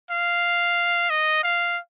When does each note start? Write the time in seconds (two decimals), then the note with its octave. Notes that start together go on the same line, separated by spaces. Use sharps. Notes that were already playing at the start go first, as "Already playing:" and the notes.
0.11 F5
1.10 D#5
1.43 F5